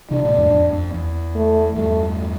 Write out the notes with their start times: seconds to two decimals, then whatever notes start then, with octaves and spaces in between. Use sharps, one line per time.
0.11 C3 E3 D4
0.24 A2 C3
0.38 F2 A2
0.52 F2
0.72 F2
0.94 E2
1.35 A3
1.75 E2 G2 A3